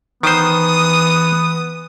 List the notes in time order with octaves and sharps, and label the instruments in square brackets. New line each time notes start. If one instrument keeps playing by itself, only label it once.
[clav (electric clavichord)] D#3 C5 [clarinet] E3 [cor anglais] B3 [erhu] D#6